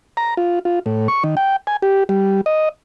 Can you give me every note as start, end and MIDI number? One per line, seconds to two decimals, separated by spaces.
0.17 0.34 82
0.37 0.59 65
0.65 0.79 65
0.86 1.08 45
1.08 1.23 85
1.24 1.35 51
1.37 1.56 79
1.67 1.77 80
1.82 2.04 67
2.09 2.41 55
2.46 2.69 75